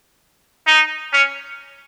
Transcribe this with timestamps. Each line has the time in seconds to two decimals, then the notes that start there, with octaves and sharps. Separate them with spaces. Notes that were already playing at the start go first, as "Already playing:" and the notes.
0.67 D#4
1.13 C#4